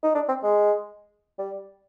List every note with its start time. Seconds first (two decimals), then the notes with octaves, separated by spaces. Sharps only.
0.03 D#4
0.15 D4
0.28 C4
0.43 G#3
1.39 G3